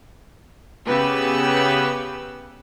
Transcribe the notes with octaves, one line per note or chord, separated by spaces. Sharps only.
C#3 B3 G4 B4 E6